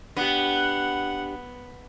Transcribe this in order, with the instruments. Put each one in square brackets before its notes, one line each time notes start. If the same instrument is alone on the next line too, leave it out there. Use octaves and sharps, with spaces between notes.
[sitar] B3 [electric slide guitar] D4 G4 [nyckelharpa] F#5